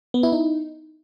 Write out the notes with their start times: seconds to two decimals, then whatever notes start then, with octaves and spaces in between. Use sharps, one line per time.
0.14 B3
0.23 E4
0.32 D#4